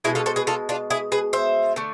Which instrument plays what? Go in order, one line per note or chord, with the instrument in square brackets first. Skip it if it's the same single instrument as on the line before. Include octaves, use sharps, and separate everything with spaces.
[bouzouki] B2 G#3 E4 G#4
F4 A4
A4 C5
G#4 B4
F4 A4
D4 F4
E4 G#4
G#4 B4
C5 E5
D3 A3